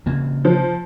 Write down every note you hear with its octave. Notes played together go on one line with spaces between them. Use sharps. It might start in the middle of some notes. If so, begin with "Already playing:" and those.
C#3 A#3 C4
F3